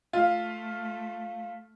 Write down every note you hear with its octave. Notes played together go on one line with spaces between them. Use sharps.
A3 F4 F5